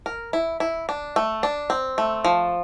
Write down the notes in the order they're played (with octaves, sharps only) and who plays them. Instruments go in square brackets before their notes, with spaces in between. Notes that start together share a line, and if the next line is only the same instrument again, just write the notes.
[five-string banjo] A#4
E4
E4
D4
A3
D4
C4
A3
F3